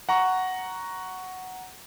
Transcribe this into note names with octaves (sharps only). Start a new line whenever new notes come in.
F#5 A#5 C#6